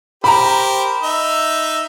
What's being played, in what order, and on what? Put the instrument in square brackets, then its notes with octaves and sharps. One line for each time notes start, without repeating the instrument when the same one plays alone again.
[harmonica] G4 A#4 C5 [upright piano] A#5 B5
[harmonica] D#4 E5